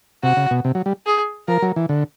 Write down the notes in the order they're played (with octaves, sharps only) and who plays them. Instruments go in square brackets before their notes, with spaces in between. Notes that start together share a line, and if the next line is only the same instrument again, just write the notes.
[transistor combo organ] C3 [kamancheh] F#4
[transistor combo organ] C#3
B2
C3
F#3
G3
[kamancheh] G#4
[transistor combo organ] F3 [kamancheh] A#4
[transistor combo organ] F#3
E3
D3